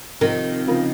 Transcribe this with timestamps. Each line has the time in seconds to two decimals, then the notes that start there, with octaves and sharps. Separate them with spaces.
0.21 C3 D#3 F3 C4
0.67 C#3 F3 C4 F4 A#4